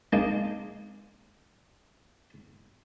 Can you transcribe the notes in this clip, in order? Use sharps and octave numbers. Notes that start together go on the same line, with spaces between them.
G#3 A#3 D4 D#4